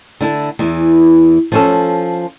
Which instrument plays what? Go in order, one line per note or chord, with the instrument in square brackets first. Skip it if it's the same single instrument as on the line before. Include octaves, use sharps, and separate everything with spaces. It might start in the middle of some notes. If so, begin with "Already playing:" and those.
[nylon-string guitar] D3 E4 A4
E2 E3
F3 C#4 A4